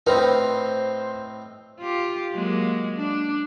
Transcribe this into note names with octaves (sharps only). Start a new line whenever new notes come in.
A2 C4 D#4 B4 C5 F6
F4 G4
F#3 G#3 A#3
D4